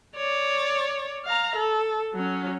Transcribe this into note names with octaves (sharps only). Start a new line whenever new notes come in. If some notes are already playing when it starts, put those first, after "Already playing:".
C#5 D5
F5 A#5
A4
F#3 C#4